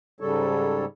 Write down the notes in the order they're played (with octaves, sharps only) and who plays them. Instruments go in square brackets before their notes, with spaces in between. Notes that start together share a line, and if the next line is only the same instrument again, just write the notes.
[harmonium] G#2 C#3 G3 A4 C#5